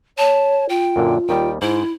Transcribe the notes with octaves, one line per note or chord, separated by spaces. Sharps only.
C#5 A5
F4 G5
F#2 A#2 D3
D#2 D#3 G3 G5
G#2 E4 C5